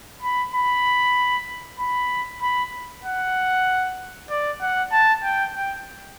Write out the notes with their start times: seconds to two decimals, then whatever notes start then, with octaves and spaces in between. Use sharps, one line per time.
0.22 B5
0.54 B5
1.79 B5
2.42 B5
3.05 F#5
4.30 D5
4.61 F#5
4.92 A5
5.23 G5
5.55 G5